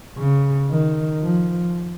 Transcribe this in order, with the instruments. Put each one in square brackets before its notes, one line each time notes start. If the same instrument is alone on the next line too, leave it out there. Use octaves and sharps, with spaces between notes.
[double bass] C#3
D#3
F3